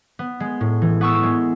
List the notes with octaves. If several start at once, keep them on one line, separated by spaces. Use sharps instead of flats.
B3
G#3
A2
E3
B3 C#6 E6
G#3